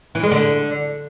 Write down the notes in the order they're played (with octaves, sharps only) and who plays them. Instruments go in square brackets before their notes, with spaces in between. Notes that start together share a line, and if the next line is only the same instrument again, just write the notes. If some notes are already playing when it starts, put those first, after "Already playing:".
[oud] E3
G#3
D3